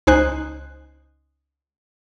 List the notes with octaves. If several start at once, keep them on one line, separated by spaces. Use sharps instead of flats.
C#2 D#4 C5 G#5 F#6